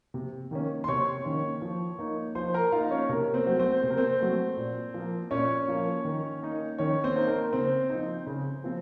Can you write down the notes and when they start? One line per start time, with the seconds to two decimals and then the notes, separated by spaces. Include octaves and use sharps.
0.14 C3
0.51 D#3 A#3 C#4
0.84 C6
0.88 C3 C#5 C#6
1.25 D#3 A#3 C#4
1.62 F3
1.99 A#3 D#4
2.35 F3 C5 C6
2.54 A#4 A#5
2.72 A#3 D#4 F4 F5
2.91 C#4 C#5
3.09 C3 A#4
3.34 C4 C5
3.47 F#3 A3
3.59 C4 C5
3.83 C3 C5
3.90 A#4
3.97 C4 C5
4.20 F#3 A3
4.57 A#2
4.94 F3
4.99 A#3
5.31 A#2 C#4 C#5
5.68 F3 A#3
6.05 D#3
6.42 A#3 D#4
6.78 D#3 C#4 C#5
7.04 C4 C5
7.16 A#3 D#4
7.28 A#4
7.53 C#3 C4 C5
7.89 F3 C4 D#4
8.27 C#3
8.64 F3 C4